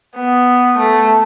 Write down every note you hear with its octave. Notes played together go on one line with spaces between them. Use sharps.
B3
A3